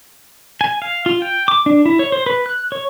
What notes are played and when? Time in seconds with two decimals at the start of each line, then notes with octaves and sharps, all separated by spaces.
0.61 G#5
0.82 F5
1.06 F4
1.22 G5
1.48 D6
1.66 D4
1.86 E4
1.99 C#5
2.12 C5
2.26 B4
2.46 F#6
2.72 C#5